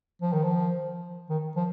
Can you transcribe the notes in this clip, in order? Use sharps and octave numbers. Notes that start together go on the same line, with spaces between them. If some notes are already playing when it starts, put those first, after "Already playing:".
F3
D#3
F3
D#3
F3